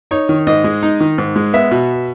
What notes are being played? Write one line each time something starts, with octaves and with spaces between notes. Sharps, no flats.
D#4 C#5
D#3
G#2 D#5
G#3
D#4
D#3
G#2
G#3
B3 E5
B2